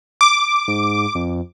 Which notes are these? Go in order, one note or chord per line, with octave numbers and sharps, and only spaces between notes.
D6
G#2
F2